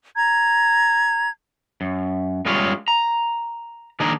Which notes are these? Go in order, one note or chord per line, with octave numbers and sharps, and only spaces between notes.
A#5 G#6
F#2
F#2 G3 G#3 F4 G#4 C#5
A#5
D#3 A#3 D4 D#4 G#4 A#4